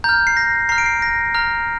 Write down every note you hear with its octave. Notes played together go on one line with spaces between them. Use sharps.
A#5 F6 G6
C7
A#6
A#5 F6 C7
D7
C7
A#6
A#5 F6